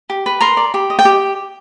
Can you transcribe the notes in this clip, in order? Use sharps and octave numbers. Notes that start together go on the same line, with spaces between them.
G4
B4
A#4 A#5 C6
D5
G4
D#5
G5
G4